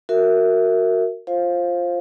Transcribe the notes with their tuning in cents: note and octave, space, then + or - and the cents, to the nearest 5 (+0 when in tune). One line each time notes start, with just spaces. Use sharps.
F#4 -5 A#4 -15 E5 +0
F4 +0 C5 +15 F5 +0